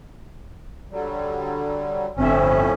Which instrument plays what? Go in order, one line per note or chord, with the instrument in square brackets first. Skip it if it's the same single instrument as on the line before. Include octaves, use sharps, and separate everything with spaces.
[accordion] D3 F#3 G3
[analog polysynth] G1 C4 E5 [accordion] A2 F3 C#4